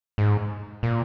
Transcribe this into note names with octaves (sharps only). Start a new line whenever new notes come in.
G#2
A#2